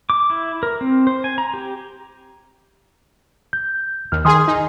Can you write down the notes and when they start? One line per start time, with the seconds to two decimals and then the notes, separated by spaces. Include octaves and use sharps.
0.10 D6
0.30 E4
0.63 A#4
0.81 C4
1.07 C5
1.24 G#5
1.38 A#5
1.54 G4
3.53 G6
4.12 D#2 F6
4.25 D#3 G#4 G#5 C6 D#6
4.48 D#4